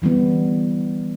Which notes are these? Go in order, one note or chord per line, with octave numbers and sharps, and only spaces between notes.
D3 E3 G3 B3